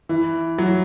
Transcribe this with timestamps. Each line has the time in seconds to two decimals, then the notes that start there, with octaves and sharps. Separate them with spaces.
0.09 E3
0.58 F#3